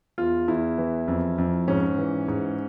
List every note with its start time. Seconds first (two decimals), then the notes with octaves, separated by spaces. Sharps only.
0.18 E2 F4
0.48 E2 E4
0.78 E3
1.08 F2
1.38 F2
1.68 G#2 C#4
1.98 E3
2.28 G#2